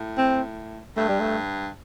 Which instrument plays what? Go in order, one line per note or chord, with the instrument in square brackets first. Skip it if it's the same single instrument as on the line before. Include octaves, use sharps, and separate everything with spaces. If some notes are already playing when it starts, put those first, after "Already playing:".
Already playing: [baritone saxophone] A2
[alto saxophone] C4
[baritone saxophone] G2 [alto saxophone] A3
[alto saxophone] G3
A3